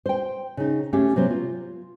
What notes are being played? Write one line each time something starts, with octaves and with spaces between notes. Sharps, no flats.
C5 G5
C#3 D#4
A3 C#4 G4 F5
C3 F#3 B3 C5
F4